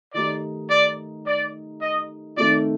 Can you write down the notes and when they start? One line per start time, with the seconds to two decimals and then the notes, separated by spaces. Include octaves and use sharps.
0.14 D#3 A3 D#4 G4 D5
0.70 D5
1.26 D5
1.81 D#5
2.37 D#3 A3 C4 D5